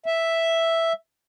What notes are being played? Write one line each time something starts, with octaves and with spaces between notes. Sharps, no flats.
E5